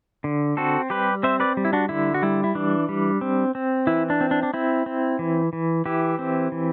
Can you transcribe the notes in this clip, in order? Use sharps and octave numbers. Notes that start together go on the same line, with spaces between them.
D3
C4 F#4 A4
G3 G4 B4
C4 C5 E5
B4 D5
G3
E4
D4 F#4
D3 E4
F#4
G3 E4
E4
E3 D4
G3
C4
C4
E3 E4
D4
C4
D4
D4
C4 E4
C4
E3
E3
E3 E4 G4
C4
E3